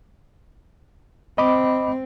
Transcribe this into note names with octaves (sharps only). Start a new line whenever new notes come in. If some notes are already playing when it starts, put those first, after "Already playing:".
C4 D#5 B5 D6